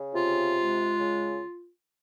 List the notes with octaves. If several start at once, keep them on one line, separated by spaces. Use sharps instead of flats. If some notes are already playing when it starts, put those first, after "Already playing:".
Already playing: C#3
C3 F4
G#3
C#3